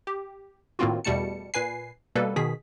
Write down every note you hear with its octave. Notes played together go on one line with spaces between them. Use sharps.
G4
A2 D#3 A#3 C4 F4 F#4
E2 B2 G3 A3 A5 C#7
A#2 B4 G#5 C7
B2 G3 A#3 A4 B4
B2 D#3 G#4 B6